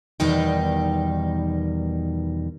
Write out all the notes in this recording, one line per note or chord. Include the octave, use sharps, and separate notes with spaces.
E2 B2 D#3 G3 D#4 G5